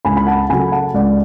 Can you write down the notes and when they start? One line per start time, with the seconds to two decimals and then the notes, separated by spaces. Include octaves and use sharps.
0.05 C#2 G#5 B5
0.17 B5
0.27 F#5 A5
0.50 C#3 F#3 A3 G#5 B5
0.72 F#5 A5
0.94 C#2 D5 F#5